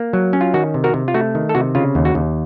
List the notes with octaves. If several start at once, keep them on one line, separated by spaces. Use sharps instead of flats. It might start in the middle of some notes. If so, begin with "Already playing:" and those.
Already playing: A#3
F#3
C#4
F4
D#3 F#4
C3
F#4 A#4
C3
F4
A3 F#4
D#3
A4
C3 F#4
C#3 F4
D#2
F#4
D#2